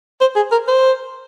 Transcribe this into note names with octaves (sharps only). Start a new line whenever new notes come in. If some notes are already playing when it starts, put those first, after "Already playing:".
C5
G#4
A#4
C5